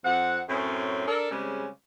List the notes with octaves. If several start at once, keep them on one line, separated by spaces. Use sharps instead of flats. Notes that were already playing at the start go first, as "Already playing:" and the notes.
F2 C4 F#5
F#2 A2 C4 C#4
D4 A4 A#4
C#3 G3 G#3 C4 C#4